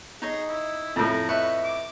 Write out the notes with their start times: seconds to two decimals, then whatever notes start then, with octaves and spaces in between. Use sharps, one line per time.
0.22 D#4 G#4 C#5 D#5
0.49 E4
0.96 F2 A2 A5 A#5
1.29 B4 C#5 D#5 E5 C#6
1.64 D6